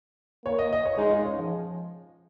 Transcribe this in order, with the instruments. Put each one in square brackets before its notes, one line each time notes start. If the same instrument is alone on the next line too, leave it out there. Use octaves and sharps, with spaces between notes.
[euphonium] A#3 [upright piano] C#5
[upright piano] D#5
D#5
C#5
[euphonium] G#3 [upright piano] D#4
[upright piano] F4
C#4
F3